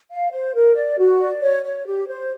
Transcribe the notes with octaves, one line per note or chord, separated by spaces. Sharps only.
F5
C5
A#4
D5
F#4
D5
C#5
C#5
G4
C5